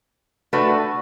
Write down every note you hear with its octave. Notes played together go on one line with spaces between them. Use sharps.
A3 D4 F#4 B4